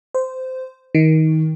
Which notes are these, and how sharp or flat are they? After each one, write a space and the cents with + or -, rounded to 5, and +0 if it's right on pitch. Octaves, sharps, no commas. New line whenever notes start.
C5 -15
D#3 +25